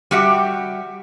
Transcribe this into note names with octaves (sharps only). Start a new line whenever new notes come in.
G3 F#4 G4 E5